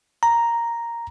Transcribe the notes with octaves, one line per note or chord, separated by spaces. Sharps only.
A#5